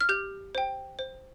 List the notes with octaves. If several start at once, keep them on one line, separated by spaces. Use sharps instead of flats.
F6
G4 G6
C5 G5
C5